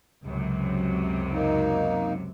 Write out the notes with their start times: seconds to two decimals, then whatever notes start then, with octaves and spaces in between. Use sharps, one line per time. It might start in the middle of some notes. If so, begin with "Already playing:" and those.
0.23 C#2 F#2 C3
1.32 A#3 D#4